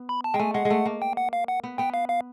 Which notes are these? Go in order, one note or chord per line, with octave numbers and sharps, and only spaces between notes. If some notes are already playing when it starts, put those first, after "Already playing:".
Already playing: B3
B5
A5
G#3 G5
A3 G#5
G#3 F#5
G#3
A3
A#3
G5
F#5
F5
F#5
B3
B3 G5
F5
F5